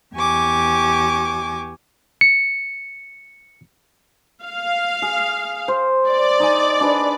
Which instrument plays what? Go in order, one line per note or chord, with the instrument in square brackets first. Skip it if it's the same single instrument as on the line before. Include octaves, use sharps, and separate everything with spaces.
[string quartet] E2 G4 G#5 C#6 D6
[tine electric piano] C#7
[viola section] F5
[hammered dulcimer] G#4
C5
[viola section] D5
[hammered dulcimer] D#4 D#5 G#5
D4 G#4 B4